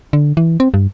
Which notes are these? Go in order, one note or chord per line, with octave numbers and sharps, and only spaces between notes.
D3
E3
C4
G2